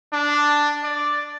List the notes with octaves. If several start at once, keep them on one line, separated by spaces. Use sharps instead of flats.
D4
D5